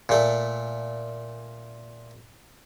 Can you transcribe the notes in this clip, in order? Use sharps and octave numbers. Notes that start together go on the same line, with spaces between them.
A#2 A3